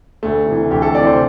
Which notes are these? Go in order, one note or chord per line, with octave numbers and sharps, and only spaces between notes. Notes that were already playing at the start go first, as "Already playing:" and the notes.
D2 A3
C3 E3
D2 G4
A4
C3 E3 D5
C5